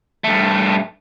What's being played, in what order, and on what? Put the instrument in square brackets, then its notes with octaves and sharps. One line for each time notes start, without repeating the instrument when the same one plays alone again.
[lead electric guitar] G2 A3